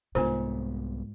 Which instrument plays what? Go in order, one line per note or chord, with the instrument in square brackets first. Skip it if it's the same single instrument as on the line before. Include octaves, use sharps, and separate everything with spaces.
[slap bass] C2 B3 [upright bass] G#2 [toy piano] D4 F4 A#4 [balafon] C5